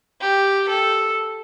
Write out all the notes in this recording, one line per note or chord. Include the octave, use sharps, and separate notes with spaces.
G4
A4